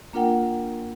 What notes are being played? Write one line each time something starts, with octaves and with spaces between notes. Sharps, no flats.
A#3 D4 F4 A#4 F#5 G5